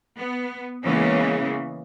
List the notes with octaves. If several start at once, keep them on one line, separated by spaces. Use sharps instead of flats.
B3
C#3 E3 G#3 A#3 B3 C#4